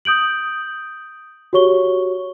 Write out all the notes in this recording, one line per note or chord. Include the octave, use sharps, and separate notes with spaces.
D#6 G6 D7 F#7
F#4 G4 C#5 C#6 G7